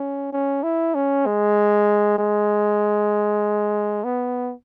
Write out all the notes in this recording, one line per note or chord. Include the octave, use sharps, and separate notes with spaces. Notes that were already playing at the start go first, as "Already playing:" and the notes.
Already playing: C#4
C#4
E4
C#4
G#3
G#3
B3